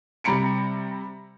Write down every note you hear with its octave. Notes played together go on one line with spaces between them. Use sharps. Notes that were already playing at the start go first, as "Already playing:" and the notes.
C3 G3 A#5 B5 C#7 D7